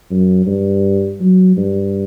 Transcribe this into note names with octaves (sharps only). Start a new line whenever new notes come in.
F#2
G2
F#3
G2